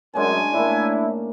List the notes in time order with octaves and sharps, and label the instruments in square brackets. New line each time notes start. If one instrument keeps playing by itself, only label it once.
[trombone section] F#2 [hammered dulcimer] G#3 C#4 D4 [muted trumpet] G#5
[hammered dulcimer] A2 A#3 [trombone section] D4 E4